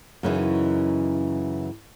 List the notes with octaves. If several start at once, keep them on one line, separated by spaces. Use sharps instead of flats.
F#2 C#3 E3 D#4